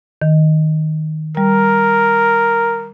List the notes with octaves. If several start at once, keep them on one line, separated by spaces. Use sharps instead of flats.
D#3
G3 A#4